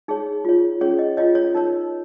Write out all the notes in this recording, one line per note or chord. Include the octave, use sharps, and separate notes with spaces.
D#4 G#4 C#5
F4 C#5
C#4 G#4 C#5
D#5
F4 C#5 D#5
C#5
D#4 A#4 C#5